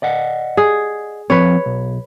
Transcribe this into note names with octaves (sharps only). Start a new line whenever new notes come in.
D5 D#5 F#5
G#4
F3 C4 B4 C#5
B1